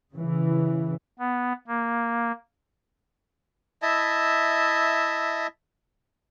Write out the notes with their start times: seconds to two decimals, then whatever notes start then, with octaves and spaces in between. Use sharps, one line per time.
0.14 C#3 E3
1.19 B3
1.67 A#3
3.82 E4 D#5 E5 A5